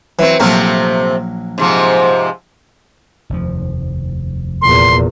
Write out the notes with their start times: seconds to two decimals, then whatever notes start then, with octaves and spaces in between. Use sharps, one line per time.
0.19 E3 F#3 C4
0.40 A#1 C3 F#3 A3 C4 A#4
1.58 G#2 C3 F3
3.30 F1 D#2 F3
4.62 E2 A#2 C6